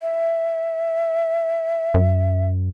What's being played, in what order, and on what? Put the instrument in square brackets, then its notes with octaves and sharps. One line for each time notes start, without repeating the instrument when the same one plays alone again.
[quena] E5
[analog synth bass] F#2